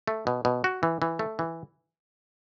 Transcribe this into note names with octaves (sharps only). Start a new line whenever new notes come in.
A3
B2
B2
F#4
E3
E3
A3
E3